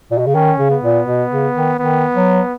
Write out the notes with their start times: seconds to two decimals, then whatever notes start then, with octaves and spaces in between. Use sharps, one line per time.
0.11 A#2
0.18 B2
0.27 C#3
0.35 D#3 C#4
0.58 C#3
0.71 B3
0.83 A#2
1.07 B2
1.31 C#3
1.55 D#3
1.79 D#3 B3
2.15 F#3